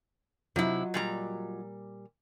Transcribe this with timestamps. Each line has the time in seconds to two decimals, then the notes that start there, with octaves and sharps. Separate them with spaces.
0.56 C3 F#3 E4 F4 D#5
0.94 A#2 G3 A#5